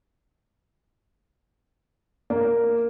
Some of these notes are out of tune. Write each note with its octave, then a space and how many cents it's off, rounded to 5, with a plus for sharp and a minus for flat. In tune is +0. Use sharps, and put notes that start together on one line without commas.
A#3 +0 D5 -40